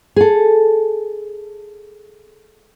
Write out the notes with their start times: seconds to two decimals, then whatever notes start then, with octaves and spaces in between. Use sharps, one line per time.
0.16 G#4 A4